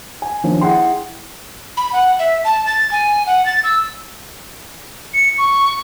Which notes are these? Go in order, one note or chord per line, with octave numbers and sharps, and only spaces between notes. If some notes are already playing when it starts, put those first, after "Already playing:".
G#5
D#3 F3 A#3 C#4 D4
E4 G#4 F#5 G5 C6
B5
F#5
E5
A5
A6
G#5
F#5
A6
E6
C#7
C#6